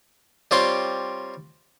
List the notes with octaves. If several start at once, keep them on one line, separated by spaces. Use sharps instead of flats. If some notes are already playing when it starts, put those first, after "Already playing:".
G3 C4 F4 C#5 C6 D6